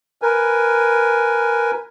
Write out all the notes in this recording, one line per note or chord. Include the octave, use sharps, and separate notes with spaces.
A#4 B4 G#5